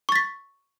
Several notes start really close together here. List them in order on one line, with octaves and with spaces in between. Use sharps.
C#6 A6 B6